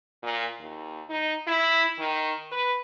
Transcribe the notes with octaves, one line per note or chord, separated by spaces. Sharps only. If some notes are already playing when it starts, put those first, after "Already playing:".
A#2
D#2
D#4
E4
D#3
B4